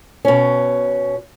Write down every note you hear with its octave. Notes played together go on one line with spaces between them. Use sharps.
B2 C#4